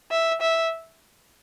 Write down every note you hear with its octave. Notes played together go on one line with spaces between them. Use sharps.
E5
E5